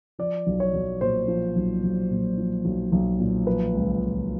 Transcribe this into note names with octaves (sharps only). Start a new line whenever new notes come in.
F3 D5
B1
C#5
B1
A#2 C5
F3
B1
B1
A#2
F3
B1
B1
A#2
F3 B4
C#2
C#2